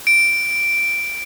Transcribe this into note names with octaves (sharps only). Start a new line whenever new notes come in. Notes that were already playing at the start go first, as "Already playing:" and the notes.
D7